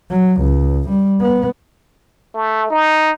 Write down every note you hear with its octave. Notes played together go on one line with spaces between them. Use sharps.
F#3
C#2
G3
B3
A3
D#4